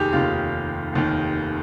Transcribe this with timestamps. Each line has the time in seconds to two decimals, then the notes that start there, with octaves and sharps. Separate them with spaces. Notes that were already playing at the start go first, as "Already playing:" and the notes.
Already playing: F1 D#2 D#3 G4 G#4
0.13 F1 D#2 D#3 F4
0.93 F1 D#2 D#3